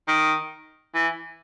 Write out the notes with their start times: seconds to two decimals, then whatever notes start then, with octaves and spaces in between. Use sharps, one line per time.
0.08 D#3
0.95 E3